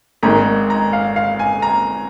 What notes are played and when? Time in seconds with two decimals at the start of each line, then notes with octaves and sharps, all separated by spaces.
0.23 G#1 G#2 D#3 A#5
0.70 A#5
0.93 F5
1.16 F5
1.39 G#5
1.62 A#5